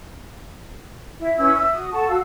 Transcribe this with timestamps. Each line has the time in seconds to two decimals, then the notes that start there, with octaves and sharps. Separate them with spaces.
1.19 E4
1.38 C#4 E4 B4 E6
1.56 E5 E6
1.73 F#4 D#6
1.92 A4 F#5 A5 C#6
2.08 F#4 F5 E6